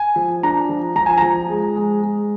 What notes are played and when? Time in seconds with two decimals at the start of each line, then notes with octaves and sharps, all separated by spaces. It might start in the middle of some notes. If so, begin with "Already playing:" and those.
Already playing: G#5
0.16 F3
0.43 D4 A#5
0.69 F3
0.96 F3 A#5
1.06 G#5
1.18 F3 A#5
1.49 G#3
1.76 G#3
2.02 G#3